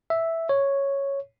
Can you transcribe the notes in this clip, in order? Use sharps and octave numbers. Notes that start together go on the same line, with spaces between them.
E5
C#5